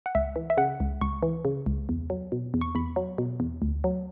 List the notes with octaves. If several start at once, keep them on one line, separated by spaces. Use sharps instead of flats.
F#5
C#2 E5
E3
E5
C#3 F#5
C#2
C#2 C#6
E3
C#3
C#2
E2
F#3
B2
E2
C#6
E2 B5
F#3
B2
E2
D2
F#3